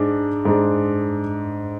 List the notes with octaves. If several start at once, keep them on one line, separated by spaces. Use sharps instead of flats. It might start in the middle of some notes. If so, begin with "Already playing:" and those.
Already playing: G#2 G#3 D4
G#2 G#3 D4